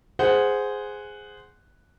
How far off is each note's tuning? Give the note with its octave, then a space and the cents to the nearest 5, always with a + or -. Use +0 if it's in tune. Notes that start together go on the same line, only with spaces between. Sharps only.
G#4 +0 C5 -10 F#5 +0